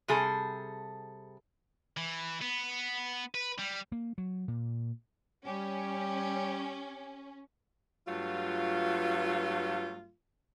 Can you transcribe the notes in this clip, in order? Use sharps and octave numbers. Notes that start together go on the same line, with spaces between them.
C3 G3 G#4 A4
E3
B3
B4
G3
A#3
F#3
A#2
G3 C#4 G4
G2 F#3 A3 F4